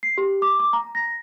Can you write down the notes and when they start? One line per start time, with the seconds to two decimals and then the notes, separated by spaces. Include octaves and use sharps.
0.03 C7
0.18 G4
0.42 D6
0.60 D6
0.73 A#5
0.95 A#6